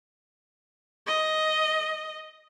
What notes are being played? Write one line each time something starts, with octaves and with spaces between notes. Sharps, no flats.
D#5